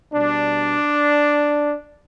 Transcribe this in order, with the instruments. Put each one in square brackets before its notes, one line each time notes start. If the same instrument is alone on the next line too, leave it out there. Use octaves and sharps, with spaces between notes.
[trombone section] B2 G3 D4